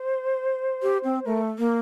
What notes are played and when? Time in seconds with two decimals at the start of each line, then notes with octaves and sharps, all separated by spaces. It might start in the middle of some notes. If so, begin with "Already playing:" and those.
Already playing: C5
0.83 G4
1.04 C4
1.25 A3 A#4
1.42 A4
1.58 A#3 A#4